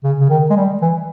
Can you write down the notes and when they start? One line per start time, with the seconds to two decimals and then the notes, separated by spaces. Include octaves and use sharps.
0.03 C#3
0.20 C#3
0.29 D#3
0.50 G#3
0.56 G3
0.81 E3